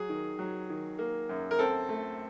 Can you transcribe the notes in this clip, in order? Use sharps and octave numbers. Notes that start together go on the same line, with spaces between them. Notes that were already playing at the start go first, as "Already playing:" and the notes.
Already playing: F#3 G#4
D#3
F#3
D#3
A#3
F#2
A#4
C4 A4
A3